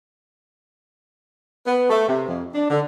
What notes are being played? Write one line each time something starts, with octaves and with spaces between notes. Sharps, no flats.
B3
A3
C3
F2
D4
D3